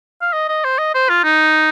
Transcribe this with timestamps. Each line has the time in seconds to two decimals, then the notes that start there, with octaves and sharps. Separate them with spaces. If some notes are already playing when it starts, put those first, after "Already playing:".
0.22 F5
0.33 D#5
0.49 D#5
0.64 C5
0.79 D#5
0.95 C5
1.09 F4
1.24 D#4